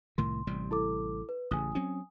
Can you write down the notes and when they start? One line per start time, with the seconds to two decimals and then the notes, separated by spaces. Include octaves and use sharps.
0.18 C2 A2 D#3 C6
0.47 A1 C3 G3
0.71 E4 A4 D6
1.29 B4
1.51 A1 C#3 G#5 D#6
1.75 F#3 C4 C#4